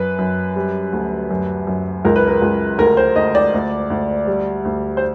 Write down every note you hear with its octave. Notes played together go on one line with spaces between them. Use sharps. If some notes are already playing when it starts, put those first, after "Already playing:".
Already playing: F#2 B4
F#2
G3
D2
F#2
F#2
C#2 A#4
B4
A#4
C#2
D2 A#4
C5
D2 D#5
D5
D2
D2
G3
D2
C5